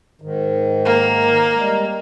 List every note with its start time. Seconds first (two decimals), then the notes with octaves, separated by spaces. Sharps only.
0.21 G#2 D#3
0.85 A#3
1.55 G3 G#3